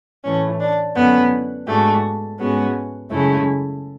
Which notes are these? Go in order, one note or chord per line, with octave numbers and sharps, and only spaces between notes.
A2 E3 A3 C#4
D4
F#2 D3 A3 B3 C#4 E4
G#2 G#3 A3 D4 F#4
G#2 G#3 B3 C#4 F#4
F#2 C#3 G#3 A3 C#4 E4